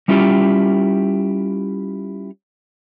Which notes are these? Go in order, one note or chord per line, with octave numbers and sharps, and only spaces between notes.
G3 C#4 E4 F4 G4